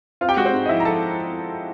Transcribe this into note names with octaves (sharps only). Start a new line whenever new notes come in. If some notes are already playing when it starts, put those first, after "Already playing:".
C4 F4 F5
G4 G5
G#3 F#4 F#5
C4 C5
G#2
D#5
F3 E4 E5
A#5
F3 A4 A5